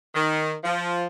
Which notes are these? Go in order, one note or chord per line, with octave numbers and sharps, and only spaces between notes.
D#3
F3